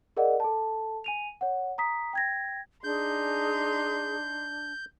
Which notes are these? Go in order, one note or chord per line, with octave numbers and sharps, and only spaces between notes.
G#4 A#4 D5 D#5 F#5
A4 A5
G#5 D#7 F7
C#5 F#5
A#5 D#6 B6
G5 G#6 A#6
D4 D#4 G#4 C6 G6